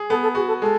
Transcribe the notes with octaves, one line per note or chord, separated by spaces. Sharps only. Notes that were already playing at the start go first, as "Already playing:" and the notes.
Already playing: G#4
B3 A4
A4
F#4 G#4
A4
G#3 A4